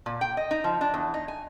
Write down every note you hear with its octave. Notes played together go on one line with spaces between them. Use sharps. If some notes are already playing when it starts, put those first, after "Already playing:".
A#2
G5
D#5
D#4
F3
D4
E2
D#4
G#5